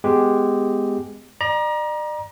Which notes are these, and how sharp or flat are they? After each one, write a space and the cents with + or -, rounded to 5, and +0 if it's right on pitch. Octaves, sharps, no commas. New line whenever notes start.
G#3 +0 B3 +25 G4 +0
D5 +45 A#5 +30